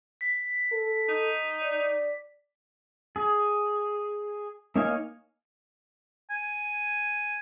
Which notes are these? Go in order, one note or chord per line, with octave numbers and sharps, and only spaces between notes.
B6
A4
D#4
D5
G#4
A#3 D#4 C#5 F5 G#5
G#5